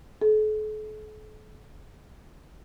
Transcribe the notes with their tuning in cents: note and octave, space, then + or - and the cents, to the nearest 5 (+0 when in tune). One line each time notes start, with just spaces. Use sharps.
A4 -45